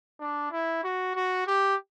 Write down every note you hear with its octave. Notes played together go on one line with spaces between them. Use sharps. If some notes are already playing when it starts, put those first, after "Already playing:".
D4
E4
F#4
F#4
G4